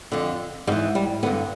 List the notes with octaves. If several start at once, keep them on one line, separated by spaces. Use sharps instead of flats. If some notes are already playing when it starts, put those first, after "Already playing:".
F2 D3
G#2 E3 G3
G3
G2 D3 B3